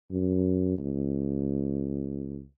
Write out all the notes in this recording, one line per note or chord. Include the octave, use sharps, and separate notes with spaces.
F#2
C#2